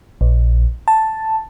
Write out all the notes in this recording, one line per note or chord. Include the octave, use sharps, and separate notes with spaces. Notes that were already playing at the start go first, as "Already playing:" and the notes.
A#1
A5